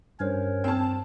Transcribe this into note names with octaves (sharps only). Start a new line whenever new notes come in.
G2 C#4 A#4 C5 C#5
C4 A5